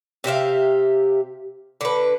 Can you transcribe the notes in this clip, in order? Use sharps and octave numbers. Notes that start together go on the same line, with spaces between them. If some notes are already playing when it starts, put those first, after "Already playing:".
C3 G4 E5 F5
D3 B4